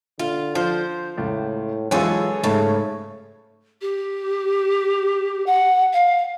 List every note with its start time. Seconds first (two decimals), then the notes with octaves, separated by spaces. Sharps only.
0.19 D3 F4
0.55 F3 C5
1.17 C#2 A2
1.91 F#2 E3 F#3 G#3 F4 G#4 A4 C#5
2.44 G#2 C#3 A3 C#5 A5
3.82 G4
5.47 F#5
5.93 F5